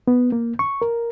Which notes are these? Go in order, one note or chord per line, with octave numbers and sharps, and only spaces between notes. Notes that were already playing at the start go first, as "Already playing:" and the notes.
B3
A#3
C#6
A#4